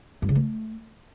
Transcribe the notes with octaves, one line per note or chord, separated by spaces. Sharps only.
G2
C#3
A3